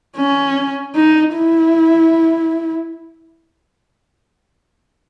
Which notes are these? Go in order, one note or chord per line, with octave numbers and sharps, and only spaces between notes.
C#4
D#4
E4